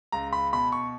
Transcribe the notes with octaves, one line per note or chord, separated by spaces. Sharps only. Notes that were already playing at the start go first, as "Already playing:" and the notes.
C#2 A#5
B5
B2 B5
C#6